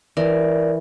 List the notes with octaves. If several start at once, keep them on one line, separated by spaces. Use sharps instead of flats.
E3 A#4 D5